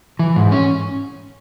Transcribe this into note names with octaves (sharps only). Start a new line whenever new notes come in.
E3
G#2
C#4